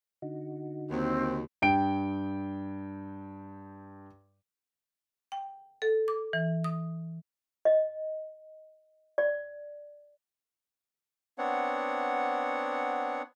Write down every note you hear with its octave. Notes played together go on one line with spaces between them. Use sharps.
D3 D#4 F#4
D#2 C4
G2 G5 D7
G5
A4
D6
E3
D#6
D#5
D5
B3 C4 D4 C#5 F#5